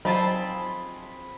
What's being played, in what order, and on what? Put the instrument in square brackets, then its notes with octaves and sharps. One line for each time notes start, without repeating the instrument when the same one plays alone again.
[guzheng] F3 C4 G#4 [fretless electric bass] F#3 [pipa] D#4 F4 A5 [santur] B5